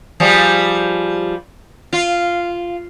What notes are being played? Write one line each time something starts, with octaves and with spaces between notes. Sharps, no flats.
F3 G3 G#4
F4